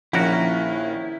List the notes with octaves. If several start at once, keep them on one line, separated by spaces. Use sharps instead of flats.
A#1 D#3 F3 C#4 E4 F#4 A#4 F#6